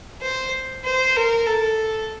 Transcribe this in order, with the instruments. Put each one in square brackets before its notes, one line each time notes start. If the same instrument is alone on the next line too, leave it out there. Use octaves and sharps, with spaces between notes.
[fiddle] C5
C5
A#4
A4